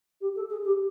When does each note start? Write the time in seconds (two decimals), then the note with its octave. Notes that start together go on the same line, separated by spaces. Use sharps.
0.20 G4
0.35 A4
0.50 G#4
0.64 G4